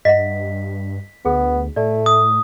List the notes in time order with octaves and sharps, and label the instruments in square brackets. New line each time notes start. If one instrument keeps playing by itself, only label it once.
[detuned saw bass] G2 [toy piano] D#5 E5 F#5 [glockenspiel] B6
[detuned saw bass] D2 [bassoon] B3 [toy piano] G#4
[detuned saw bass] A2 [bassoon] A3 [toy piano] D5
[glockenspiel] D#6